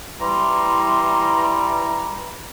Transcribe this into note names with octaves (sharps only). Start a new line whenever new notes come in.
E3 G3 A#5 C6